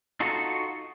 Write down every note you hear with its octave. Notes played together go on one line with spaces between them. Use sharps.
D#4 F4 F#4 A4